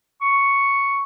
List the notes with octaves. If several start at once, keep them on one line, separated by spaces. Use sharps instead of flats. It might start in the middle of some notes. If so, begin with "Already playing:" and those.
C#6